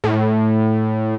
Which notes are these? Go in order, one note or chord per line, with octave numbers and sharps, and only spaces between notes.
A2